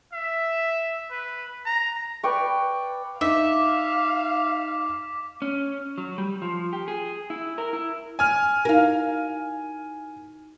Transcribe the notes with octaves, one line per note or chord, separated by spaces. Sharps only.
E5
B4
A#5
B4 D5 G5 C#6
D#4 E5 F5 D6 B6
C#4
F#3
G3
F3
G4
G#4
E4
A#4
E4
G#5 F6
D#4 E4 F#4 A#4 F5